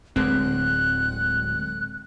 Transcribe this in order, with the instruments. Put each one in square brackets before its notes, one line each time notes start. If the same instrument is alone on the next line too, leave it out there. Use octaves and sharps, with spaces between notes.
[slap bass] D1 [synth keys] D3 G#3 C4 [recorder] F#6